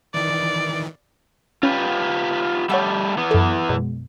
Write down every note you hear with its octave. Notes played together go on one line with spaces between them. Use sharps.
D#3 E3 D5
C#4 F4 G4 B4
G3 A3 C#5 F#5 E6
E3 B3
F#2 A4
F#2 B2 G#3